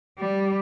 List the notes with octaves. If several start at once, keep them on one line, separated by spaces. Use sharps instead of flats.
G3